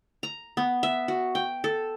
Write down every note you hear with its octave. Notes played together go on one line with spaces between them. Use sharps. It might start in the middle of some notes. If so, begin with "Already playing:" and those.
A#5
B3
E5
F#4
G5
A4